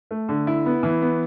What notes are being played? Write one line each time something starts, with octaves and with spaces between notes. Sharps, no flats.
A3
D3
E4
B3
E3
B3